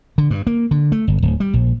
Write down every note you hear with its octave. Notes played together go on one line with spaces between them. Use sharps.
D3
G2
A#3
D3
A3
G1
D1
G3
A#1